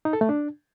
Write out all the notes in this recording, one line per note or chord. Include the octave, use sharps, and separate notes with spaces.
D#4
A4
A3
D4